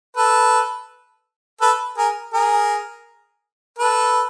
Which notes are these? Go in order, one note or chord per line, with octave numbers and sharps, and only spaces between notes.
A4 B4
A4 B4
G#4 A#4
G#4 A#4
A4 B4